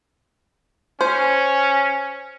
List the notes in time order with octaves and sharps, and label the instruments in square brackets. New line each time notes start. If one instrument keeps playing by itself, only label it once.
[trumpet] C#4 [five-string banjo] C5